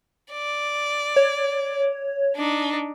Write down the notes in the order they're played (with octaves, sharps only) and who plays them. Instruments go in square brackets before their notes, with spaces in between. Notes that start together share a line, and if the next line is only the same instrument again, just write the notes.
[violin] D5
[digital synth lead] C#5
[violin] D4 D#4